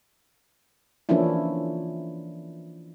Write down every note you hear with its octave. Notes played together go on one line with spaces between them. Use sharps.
E3 F3 A#3 C#4 D4 E4